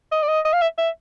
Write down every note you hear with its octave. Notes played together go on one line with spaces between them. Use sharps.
D#5
D5
D#5
D#5
F5
E5
E5